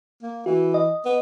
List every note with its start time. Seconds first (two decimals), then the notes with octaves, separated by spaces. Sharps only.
0.22 A#3
0.46 E3 F#4
0.74 D#5
1.05 B3